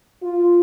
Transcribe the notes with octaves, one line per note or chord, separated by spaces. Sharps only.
F4